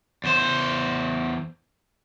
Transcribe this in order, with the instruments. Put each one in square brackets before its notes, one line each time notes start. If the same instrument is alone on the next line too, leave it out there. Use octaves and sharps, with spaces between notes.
[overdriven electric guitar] E2 C5